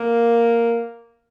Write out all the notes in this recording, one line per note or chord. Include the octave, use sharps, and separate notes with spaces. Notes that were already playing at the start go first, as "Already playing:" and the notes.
Already playing: A#3